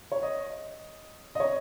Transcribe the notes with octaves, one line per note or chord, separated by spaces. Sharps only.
C#5
D#5
D#5
C#5